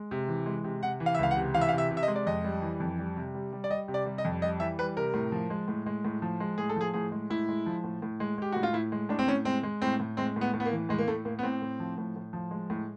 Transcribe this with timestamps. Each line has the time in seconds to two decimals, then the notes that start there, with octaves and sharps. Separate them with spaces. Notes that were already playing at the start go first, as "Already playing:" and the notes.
Already playing: G#3
0.11 C3
0.28 E3
0.46 G#3
0.64 C3
0.83 C3 F#5
1.00 E3
1.06 F5
1.15 E5
1.19 C#2 F5
1.31 F#5
1.37 C3
1.54 E3 F5
1.61 E5
1.69 F5
1.73 C3
1.78 E5
1.91 C3
1.97 E5
2.03 D#5
2.08 G#3
2.16 D5
2.27 F2 D#5
2.44 G3
2.62 E3
2.80 F2
2.98 G3
3.17 C3
3.34 G3
3.52 G3
3.64 D5
3.70 G3 D#5
3.88 C3
3.94 D5
4.06 G3
4.18 D#5
4.25 F2
4.42 G3 D#5
4.60 E3 E5
4.79 G3 B4
4.97 C3 A#4
5.14 A2
5.32 F3
5.50 G#3
5.68 A2
5.86 G#3
6.05 A2
6.22 F3
6.40 G#3
6.58 A2 G#4
6.69 A4
6.76 F3 G#4
6.94 A2 G#4
7.12 G#3
7.30 A2 E4
7.49 G#3
7.66 F3
7.84 A2
8.02 A2
8.20 G#3
8.38 G#3 G4
8.52 A2 F#4
8.63 F4
8.73 A2 E4
8.92 G#3
9.09 A2 D4
9.19 C4
9.28 A2 C#4
9.45 G#3 C4
9.63 G#3
9.82 A2 C4
10.00 A2
10.17 G#3 C4
10.36 A2
10.41 B3
10.54 A2
10.60 B3
10.65 A#3
10.72 E3
10.89 A2 G#3
10.98 A#3
11.08 A2 A3
11.25 A2 A#3
11.39 B3
11.43 A2 C4
11.62 A2
11.80 F3
11.98 A2
12.16 A2
12.33 F3
12.51 G#3
12.70 A2